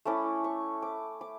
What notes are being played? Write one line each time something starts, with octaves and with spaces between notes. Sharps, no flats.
A3 C#4 E4 D6
C#6
D6
D6